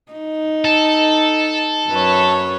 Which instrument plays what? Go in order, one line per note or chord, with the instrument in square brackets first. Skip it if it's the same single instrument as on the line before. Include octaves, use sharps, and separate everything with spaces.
[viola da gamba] D#4
[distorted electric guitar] A4
[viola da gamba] F#2 B4 C#5